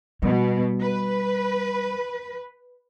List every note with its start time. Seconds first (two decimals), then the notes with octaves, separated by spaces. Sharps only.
0.22 B2 G3
0.80 B4